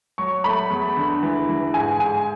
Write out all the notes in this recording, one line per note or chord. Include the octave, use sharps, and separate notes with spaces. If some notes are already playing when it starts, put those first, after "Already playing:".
F#3 C#6
A3 B5
E2
D3
E3
E3
G#2 G#5
G#2 G#5